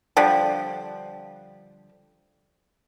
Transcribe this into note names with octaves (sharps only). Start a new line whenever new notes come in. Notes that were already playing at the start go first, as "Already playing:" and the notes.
D3 F3 G3